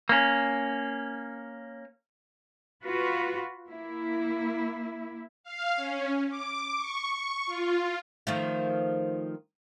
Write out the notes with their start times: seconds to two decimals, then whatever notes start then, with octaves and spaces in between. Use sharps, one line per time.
0.09 A#3 C#4
2.83 F4 F#4 B4
3.68 A#3 E4
5.44 F5
5.76 C#4
6.29 D6
6.76 C#6
7.46 F4
8.27 D#3 F3 A3